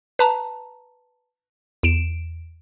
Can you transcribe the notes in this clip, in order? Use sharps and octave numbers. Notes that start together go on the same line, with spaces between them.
B4 A5 A#5
E2 D7 E7